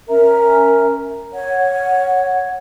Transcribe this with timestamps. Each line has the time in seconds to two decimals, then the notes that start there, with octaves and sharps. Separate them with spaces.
0.08 C#4 A#4 E5 A#5
1.33 C#5 F#5